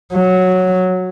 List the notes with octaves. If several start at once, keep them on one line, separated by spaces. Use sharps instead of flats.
F#3